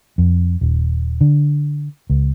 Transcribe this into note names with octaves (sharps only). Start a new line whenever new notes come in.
F2
D#1
D3
C#2